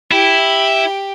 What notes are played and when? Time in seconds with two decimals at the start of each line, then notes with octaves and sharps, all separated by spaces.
0.11 E4 G4